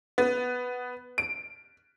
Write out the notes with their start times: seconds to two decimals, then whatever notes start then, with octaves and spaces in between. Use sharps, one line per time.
0.18 B3
1.18 D7